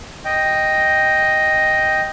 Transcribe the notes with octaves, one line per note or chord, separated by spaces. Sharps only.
D#5 G5